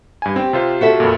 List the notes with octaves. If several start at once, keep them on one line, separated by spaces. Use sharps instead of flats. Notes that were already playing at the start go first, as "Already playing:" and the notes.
G2 G#5
C4 G4
C3 F4 C5
F#4 A4 E5
F2 A#2